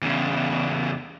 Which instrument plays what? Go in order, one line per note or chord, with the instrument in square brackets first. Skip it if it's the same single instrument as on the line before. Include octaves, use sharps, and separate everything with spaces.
[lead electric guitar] E2 C#3